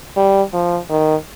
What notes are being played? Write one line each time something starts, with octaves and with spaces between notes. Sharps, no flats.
G3
F3
D#3